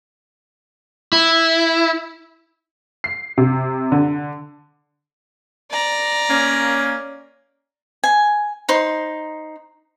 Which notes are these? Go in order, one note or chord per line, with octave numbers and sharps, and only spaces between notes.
E4
C7
C3
D3
D5 A#5
A#3 C#4
G#5
D#4 C5 C6